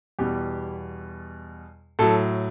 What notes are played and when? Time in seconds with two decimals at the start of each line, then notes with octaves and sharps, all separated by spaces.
0.19 E2 B2 G3 G4
1.99 A2 F#3 A4